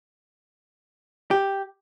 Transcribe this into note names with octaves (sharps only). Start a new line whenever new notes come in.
G4